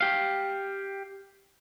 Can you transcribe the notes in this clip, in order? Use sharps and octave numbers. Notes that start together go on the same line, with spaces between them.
G4 F5